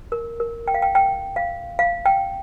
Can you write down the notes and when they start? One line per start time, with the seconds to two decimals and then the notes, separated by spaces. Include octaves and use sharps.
0.12 A#4
0.40 A#4
0.68 G5
0.74 F5
0.82 G5
0.95 G5
1.36 F5
1.79 F5
2.06 G5